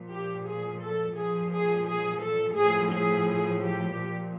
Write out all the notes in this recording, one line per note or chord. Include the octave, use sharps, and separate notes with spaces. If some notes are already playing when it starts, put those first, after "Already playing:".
Already playing: A#2 F3
G4
G#4
A4
A#2 F3 G#4
G#4
G#4
A4
A2 F3 G#4
G#4
G4
A#2 F3